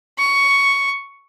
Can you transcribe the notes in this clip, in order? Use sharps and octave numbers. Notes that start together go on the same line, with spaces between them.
C#6